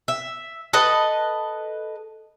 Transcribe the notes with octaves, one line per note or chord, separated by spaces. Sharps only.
E5
A4 B4 D#5